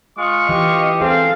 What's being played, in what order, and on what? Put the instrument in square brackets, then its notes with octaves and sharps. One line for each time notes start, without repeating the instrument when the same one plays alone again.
[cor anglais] G#3 [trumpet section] F4 F5 C#6
[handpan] E3 [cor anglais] G4 [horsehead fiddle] D#5
[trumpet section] C4 [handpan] G#4 [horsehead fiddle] A4 F5